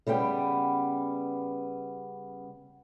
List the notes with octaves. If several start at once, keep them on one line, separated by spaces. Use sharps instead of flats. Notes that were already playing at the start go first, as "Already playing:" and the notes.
C#3 G3 B3 G5